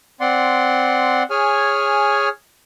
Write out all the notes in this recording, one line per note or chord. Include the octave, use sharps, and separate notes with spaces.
C4 D5 F#5 C6
G#4 C#5 G#5 F6